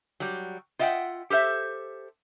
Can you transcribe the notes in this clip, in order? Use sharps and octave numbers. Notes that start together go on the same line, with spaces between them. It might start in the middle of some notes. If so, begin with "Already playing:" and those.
F#3 G3
F4 D#5 E5 F#5 G5
G4 A4 C5 E5